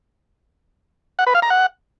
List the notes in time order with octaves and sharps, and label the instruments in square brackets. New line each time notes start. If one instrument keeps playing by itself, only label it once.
[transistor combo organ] F#5
B4
F5
A#5
F#5